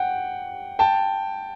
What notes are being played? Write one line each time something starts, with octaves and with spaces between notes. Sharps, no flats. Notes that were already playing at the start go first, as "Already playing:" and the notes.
Already playing: F#5 G5
G5 A5